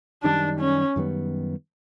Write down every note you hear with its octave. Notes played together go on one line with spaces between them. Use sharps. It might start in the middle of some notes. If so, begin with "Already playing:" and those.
F#2 D#3 G3 D4
C#4
F#2 D#3 G3 B3